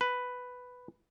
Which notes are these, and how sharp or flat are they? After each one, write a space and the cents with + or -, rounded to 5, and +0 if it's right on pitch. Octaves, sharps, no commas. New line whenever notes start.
B4 +5